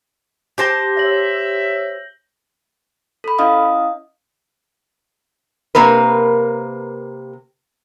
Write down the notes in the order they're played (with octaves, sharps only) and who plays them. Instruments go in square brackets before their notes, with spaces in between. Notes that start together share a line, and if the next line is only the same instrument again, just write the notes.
[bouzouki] G4 C5 A5 [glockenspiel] G6 A#6 G7
[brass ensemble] C#5 E5 [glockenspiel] A#6 F#7
[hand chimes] A4 B5
C#4 E4 D#5 F5 D#6
[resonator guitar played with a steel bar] C3 A#3 A#4 B4